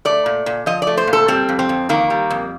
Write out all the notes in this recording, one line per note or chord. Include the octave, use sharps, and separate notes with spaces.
A3 D5
A#2
A#2
F3 D#5
A3 D5
C5
A#2
A4
G3 C4
F2
C4
F2
D#3 A#3
G3
F2